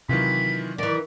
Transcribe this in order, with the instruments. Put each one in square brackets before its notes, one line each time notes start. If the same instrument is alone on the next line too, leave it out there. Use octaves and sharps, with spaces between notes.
[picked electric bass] C3 F#3 [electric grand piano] D#3 E3 F4 [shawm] B5
[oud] D#3 E3 [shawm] D5